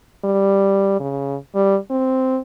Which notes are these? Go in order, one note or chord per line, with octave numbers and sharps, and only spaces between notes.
G3
C#3
G3
C4